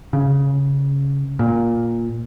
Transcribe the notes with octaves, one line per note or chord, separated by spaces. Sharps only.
C#3
A#2